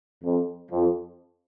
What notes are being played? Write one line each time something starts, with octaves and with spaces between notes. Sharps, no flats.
F2
F2